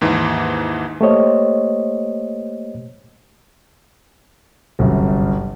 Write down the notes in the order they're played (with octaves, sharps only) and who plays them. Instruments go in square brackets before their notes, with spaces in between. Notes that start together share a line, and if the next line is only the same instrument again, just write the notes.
[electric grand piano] D#2 G#2 E3
[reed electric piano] A3 A#3 G4 C5 C#5 D#5
[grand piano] G1 C2 F#2